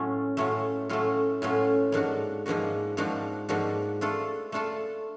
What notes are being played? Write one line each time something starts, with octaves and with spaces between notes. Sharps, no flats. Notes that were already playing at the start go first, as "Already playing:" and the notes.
Already playing: A2 F#3 A3 C#4 F4
A2 F#3 A3 C#4 F4
A2 F#3 A3 C#4 F4
A2 F#3 A3 C#4 F4
G#2 F3 A#3 D4 F#4
G#2 F3 A#3 D4 F#4
G#2 F3 A#3 D4 F#4
G#2 F3 A#3 D4 F#4
A3 D4 F4 A4
A3 D4 F4 A4